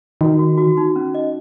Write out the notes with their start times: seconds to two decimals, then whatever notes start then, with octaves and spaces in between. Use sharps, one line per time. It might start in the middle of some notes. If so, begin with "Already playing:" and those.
0.21 D#3 F#4
0.39 F#4
0.58 F#4
0.77 D#4
0.96 C#4
1.14 D#5